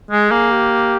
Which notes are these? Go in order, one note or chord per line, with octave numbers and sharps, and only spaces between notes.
G#3 G#4
A#3 G#4
G4